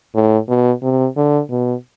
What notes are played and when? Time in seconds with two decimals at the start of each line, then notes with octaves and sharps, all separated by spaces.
0.14 A2
0.48 B2
0.82 C3
1.17 D3
1.50 B2